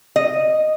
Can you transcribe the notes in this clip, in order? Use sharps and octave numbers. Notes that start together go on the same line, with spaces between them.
D#5